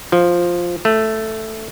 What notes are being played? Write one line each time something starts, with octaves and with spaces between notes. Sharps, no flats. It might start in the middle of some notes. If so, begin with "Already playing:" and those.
F3
A3